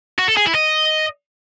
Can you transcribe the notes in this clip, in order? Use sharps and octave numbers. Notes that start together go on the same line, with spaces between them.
F#4
A4
G#4
E4
D#5